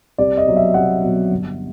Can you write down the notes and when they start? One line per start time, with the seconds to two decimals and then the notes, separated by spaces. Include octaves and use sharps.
0.18 C2 D5
0.37 D#5
0.47 B2 F#3
0.57 E5
0.74 C2 F#5
1.03 B2 F#3
1.31 G1